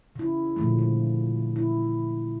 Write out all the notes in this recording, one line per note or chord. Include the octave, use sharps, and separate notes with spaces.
C#3 E4
A#2 D3 F3 G#3 A3
D3
E4